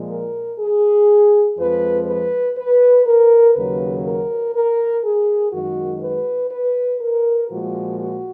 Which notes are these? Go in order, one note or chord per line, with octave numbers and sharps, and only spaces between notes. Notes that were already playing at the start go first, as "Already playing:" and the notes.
Already playing: A#2 F3 G#3
A#4
G#4
F2 F3 G#3 B4
B4
B4
A#4
D#2 C#3 F#3 B4
A#4
A#4
G#4
F#2 D#3 G#3 F#4
B4
B4
A#4
A#2 F3 G#3 F#4
F#4